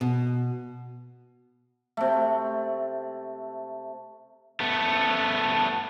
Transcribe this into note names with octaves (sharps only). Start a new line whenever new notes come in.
B2
C3 A3
A3 B3